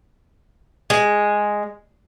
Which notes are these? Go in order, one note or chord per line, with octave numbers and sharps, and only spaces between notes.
G#3